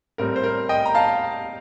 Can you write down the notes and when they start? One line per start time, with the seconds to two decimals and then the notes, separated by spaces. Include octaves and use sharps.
0.18 A2 G3 C4 A#4
0.36 C5
0.43 A#4
0.69 D#5 G5
0.86 A#5
0.95 F5 A5